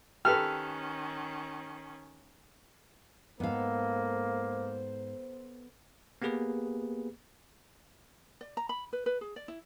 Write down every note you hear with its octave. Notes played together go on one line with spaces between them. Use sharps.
D#3 C#4 G4 A4 B4 F6
G#2 A#3 B3 A4 C5 F5
A#3 B3 G4 G#4 B4
D5
A#5
B5
B4
B4
G#4
D5
E4